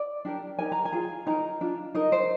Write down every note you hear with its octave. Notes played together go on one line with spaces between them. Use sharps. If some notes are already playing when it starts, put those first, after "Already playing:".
Already playing: D5
D4 G4 A#4
D#4 G4 A#4 G#5
A#5
G#5
F4 G#4
D#4 A#4 A#5
D4 F4
D#4 A#4 D#5
C5